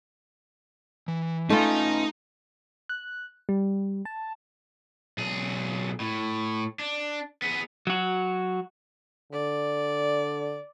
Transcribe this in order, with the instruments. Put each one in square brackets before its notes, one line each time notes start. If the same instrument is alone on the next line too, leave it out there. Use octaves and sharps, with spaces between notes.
[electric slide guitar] E3
[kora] A3 F4 [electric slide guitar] C#4 B4 G#5 [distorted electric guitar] D#4
[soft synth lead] F#6
G3
A5
[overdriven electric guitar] B1 G#4
A2
D4
B3 G#4
[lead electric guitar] F#3 F#4
[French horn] D3 [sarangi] D5